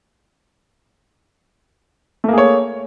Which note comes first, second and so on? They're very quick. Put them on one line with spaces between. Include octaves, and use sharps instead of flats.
A3 A#3 G#4 C#5